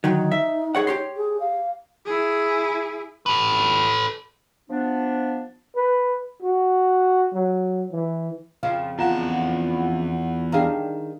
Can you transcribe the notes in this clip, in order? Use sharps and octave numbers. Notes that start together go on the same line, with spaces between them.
D2 D#3 F#3 D#4
E5
G#4 C#5 F#5
G4 C#5 C6
G#4
F5
E4 G#4
A4 B4
F3 B3 D4
B4
F#4
F#3
E3
F2 C#3 F3 F5
E2 F4 F#5 A5 A#5
D#3 D4 G#4 F5 A#5